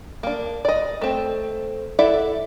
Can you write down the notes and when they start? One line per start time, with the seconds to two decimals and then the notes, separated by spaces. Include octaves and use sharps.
0.23 A#3 D4
0.65 D5 D#5
1.01 A3 C4
1.99 E4 A4 D5 E5 F#5